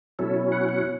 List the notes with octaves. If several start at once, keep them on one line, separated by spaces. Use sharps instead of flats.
B2 F#3 C#4 E4 A4
F#5
F#5